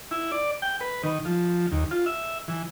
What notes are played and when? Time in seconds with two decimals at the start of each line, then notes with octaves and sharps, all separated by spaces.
0.11 E4
0.32 D5
0.62 G5
0.81 B4
1.03 D#3
1.25 F3
1.72 D#2
1.91 F4
2.06 E5
2.48 E3